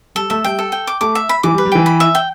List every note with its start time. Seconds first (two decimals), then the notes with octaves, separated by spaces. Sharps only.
0.15 G3 A4
0.30 A3 E5
0.44 G3 G5
0.59 A4
0.72 G5
0.87 D6
1.01 A3 D6
1.15 E5
1.29 B5
1.43 E3 D6
1.54 G3
1.58 B4
1.65 G3
1.72 E3 G5
1.86 B5
2.00 E5
2.15 G5